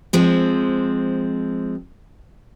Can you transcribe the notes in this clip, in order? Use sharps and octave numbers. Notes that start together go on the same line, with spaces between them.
F3 G#3 C4